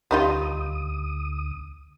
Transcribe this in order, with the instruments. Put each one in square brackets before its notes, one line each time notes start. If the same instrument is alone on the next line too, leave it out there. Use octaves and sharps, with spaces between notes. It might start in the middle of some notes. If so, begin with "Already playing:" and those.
[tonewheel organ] D2 D#6 [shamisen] G3 D#4 F4